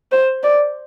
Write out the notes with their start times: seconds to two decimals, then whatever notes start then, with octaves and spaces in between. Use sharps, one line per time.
0.12 C5
0.43 D5